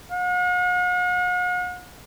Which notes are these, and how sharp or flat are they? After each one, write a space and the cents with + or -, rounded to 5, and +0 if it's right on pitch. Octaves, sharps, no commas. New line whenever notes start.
F#5 -45